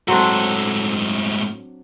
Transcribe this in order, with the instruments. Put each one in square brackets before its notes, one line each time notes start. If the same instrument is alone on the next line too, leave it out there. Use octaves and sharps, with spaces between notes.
[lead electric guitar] G#2 A3 [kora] F#3 C4 D4